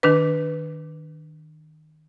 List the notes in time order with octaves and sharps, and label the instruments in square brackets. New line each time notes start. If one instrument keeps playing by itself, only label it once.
[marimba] D#3 D4 B4